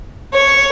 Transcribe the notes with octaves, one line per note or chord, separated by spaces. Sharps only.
C#5